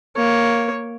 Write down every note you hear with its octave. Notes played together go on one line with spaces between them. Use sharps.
A#3 C#5